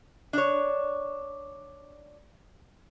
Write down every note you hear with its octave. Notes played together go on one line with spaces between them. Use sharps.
D4 C#5